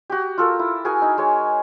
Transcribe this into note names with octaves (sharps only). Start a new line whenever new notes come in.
F#4 G4
F4 A4 A#4
E4
F#4 G#4 A#4 G#5
D#4
G#3 C#5